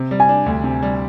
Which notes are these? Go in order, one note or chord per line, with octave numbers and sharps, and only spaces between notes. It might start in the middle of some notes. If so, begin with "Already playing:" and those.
Already playing: C3
G3
G#5
D4
D2
C3
G3